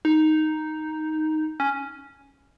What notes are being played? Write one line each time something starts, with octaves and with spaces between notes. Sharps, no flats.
D#4
C#4